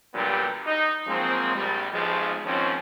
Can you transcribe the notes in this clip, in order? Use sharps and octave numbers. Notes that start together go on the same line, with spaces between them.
A#2 D3 F#3 G3 B3 G4
D#4
F3 F#3 G#3 A#3 C4
A#1 G3
B1 F3 G#3
D#2 G#2 F3 C4 C#4